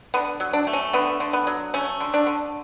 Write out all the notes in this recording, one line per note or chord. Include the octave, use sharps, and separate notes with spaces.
D3 B3
F#3
D4
A3
C#4
D3 B3
D3
B3
F#3
A3 C#4
D3
D4
D3